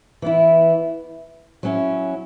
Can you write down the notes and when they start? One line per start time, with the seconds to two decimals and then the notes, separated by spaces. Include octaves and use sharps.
0.22 E3 B3 E4
1.63 F#3 C#4 E4